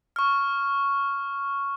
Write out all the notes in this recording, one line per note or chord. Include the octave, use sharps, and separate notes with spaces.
C#6 F6